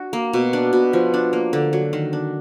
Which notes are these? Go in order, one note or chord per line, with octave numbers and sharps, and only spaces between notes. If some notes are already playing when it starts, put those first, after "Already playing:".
Already playing: D4 F#4
A#3
B2
D4
B2
F3
D4
A#3
D3
F#3
D#3
D4